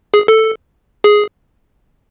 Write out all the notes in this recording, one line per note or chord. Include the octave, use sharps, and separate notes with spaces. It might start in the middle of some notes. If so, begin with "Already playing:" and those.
G#4
A4
G#4